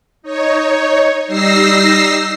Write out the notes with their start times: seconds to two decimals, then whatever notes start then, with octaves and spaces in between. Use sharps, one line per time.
0.22 D#4 C#5
1.27 G3 D#4 E6 A#6 C7